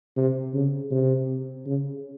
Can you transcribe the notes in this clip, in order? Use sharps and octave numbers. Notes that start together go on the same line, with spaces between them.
C3
C#3
C3
C#3